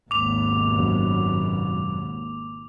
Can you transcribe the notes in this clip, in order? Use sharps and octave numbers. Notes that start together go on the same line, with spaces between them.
G#1 D#2 B2 D6 F7
F#2